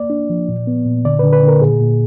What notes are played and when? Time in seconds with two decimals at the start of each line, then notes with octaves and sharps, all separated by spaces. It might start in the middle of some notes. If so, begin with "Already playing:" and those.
Already playing: A#3 D5
0.10 D4
0.30 F3
0.48 A#2
0.67 B3
0.86 A#2
1.05 D3 D5
1.19 D3 B4
1.33 B4
1.43 D3 A#4
1.61 A#2 G#4
1.80 A#2